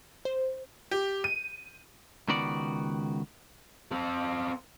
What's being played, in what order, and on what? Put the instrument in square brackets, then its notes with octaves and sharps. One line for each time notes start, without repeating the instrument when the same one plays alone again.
[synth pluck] C5
[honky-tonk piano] G4
D#7
[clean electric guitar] C#2 D#3 B3 F#4 D5
[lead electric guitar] C4 A4